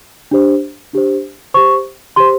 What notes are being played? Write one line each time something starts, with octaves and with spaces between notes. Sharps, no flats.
D4 G4 C5
D4 G4 C5
G4 C5 C#6
G4 C5 C6